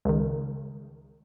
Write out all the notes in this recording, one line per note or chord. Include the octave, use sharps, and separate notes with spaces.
C#2 D#3